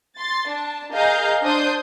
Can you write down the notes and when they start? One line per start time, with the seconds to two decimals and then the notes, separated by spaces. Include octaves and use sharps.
0.16 C6 A6
0.49 D4 A5
0.93 G#4 A#4 D#5 F5 A#5 G6
1.43 D4 C5 C6 D#6 G6